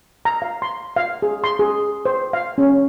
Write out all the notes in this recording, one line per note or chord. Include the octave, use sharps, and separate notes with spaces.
A#5
F5
C6
F5
G#4
C6
G#4
C5
F5
C#4